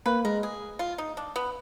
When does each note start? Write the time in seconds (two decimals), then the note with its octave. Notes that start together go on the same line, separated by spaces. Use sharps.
0.06 A#3 B4
0.24 G#3 A#4
0.43 G#4
0.79 F4
0.98 D#4
1.17 D4
1.36 B3